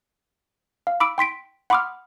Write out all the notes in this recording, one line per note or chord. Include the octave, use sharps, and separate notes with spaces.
F5
B5 D6 E6 D7
G5 C6 B6 D7
F#5 B5 C6 D6 D#6 F6